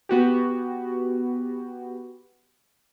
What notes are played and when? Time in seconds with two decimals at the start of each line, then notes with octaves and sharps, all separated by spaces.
0.09 B3 F#4 G4